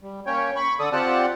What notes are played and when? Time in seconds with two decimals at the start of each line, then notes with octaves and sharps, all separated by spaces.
0.02 G3
0.26 A#3 C#4 C#5 G5
0.56 B5 C#6
0.80 D3 A4 D5 D#6
0.92 C4 F4 G4 D5 F#5 A5